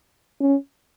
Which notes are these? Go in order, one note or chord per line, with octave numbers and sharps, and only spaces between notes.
C#4